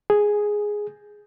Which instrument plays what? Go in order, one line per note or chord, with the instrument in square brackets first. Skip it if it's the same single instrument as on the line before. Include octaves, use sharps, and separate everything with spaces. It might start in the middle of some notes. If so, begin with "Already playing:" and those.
[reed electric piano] G#4